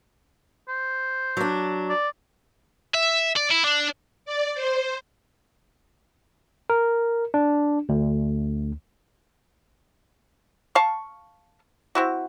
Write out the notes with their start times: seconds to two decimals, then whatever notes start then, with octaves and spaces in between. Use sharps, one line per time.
0.68 C5
1.37 F#3 D4
1.89 D5
2.94 E5
3.37 D5
3.51 E4
3.64 D4
4.25 D5
4.55 C5
6.70 A#4
7.34 D4
7.89 D2
10.75 F5 A5 C#6
11.95 C4 E4 F#4